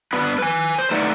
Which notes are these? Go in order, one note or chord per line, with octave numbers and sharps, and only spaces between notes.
G2 B3 B4
B4 G#5
C5
A3 D#4 A4 B4 D5 F#5